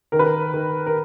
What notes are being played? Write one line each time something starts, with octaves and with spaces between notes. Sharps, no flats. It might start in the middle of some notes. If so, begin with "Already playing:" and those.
D#3 A#4
B4
A#4
D#3
A#4